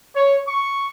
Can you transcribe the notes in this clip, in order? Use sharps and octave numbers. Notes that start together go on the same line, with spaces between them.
C#5
C#6